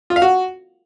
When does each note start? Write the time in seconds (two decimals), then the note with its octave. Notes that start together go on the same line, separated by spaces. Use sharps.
0.10 F4
0.16 F5
0.22 F#4